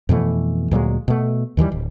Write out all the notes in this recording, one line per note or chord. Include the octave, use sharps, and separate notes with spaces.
F2 B2 E3 A3
D2 A#2 F#3 G#3
B2 A3
D#2 D#3 E3 G3
D1